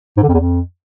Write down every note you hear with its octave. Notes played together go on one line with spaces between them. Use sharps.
G#2
D3
F2
E2
F2